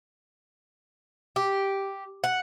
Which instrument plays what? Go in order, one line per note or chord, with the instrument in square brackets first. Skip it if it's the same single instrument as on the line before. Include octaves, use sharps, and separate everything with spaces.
[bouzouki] G4
F#5